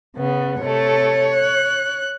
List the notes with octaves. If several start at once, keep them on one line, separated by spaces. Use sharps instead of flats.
C#3 B3
C3 A3 C#5
F#6